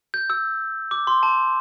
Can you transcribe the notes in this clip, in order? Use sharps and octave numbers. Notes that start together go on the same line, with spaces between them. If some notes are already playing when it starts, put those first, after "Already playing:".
G6
E6
D6
C6
A5